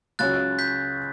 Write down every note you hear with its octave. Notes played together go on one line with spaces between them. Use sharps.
C#2 C#3 F#3 C#4 F#6 A6
G6 B6